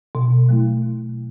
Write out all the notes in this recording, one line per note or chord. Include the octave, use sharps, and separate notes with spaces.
B2
F#3 A3 E4
B2